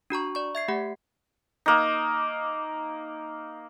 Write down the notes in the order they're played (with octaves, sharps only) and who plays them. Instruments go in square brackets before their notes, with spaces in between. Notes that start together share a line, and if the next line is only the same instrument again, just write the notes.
[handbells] D4 F#4 A#5 C#6
D5 C#6
E5 G#6 C7
A3 G4 F#5
[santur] A#3 D#4